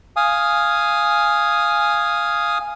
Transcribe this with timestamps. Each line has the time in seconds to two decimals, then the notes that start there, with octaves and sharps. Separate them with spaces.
0.16 F5 G#5 D#6